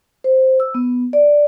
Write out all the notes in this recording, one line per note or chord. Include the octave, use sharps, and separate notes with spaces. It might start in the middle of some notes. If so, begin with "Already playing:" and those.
C5
E6
B3
D5